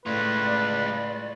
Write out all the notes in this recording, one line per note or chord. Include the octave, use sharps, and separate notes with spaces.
A2 G#3 F4 B4 D5